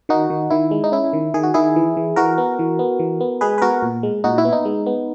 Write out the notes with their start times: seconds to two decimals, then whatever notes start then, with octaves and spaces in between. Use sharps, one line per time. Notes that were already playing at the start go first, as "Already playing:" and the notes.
0.09 D#3 D#4 F#4
0.30 D#3
0.50 D#3 E4
0.71 G#3
0.84 D#4
0.92 C#4 E4
1.13 D#3
1.34 D#3 G#4
1.43 F#4
1.54 D#3 E4 G#4
1.76 E3
1.97 E3
2.16 E3 F#4 A#4
2.38 B3
2.59 E3
2.79 B3
2.99 E3
3.21 B3
3.41 G#3 G#4 B4
3.58 B4
3.62 B3 F#4 A#4
3.82 A#2
4.03 G#3
4.24 A#2 D#4 F#4
4.38 E4
4.45 B3
4.53 D#4
4.65 G#3
4.86 B3